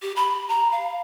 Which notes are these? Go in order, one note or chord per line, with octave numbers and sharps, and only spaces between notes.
G4
B5
A#5
F5